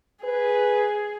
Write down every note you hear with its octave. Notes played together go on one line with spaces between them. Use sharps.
G#4 B4